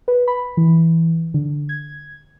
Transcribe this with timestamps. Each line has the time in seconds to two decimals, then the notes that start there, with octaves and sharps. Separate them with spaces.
0.08 B4
0.28 B5
0.57 E3
1.34 D3
1.69 G#6